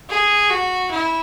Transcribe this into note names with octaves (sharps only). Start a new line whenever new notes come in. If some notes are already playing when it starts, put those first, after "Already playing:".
G#4
F#4
E4